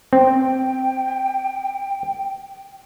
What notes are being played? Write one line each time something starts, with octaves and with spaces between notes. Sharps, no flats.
C4 G5